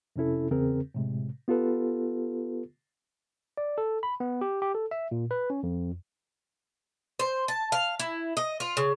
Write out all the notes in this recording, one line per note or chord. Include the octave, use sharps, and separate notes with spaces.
F2 C3 C#4 E4 A4
E2 C#3 C4 G#4 A#4
A2 C3 G#3
B3 F4 G4 A4 B4
D5
A4
B5
B3
G4
G4
A4
E5
A#2
B4
C#4
F2
C5
A5
F5
E4
D#5
F4
C#3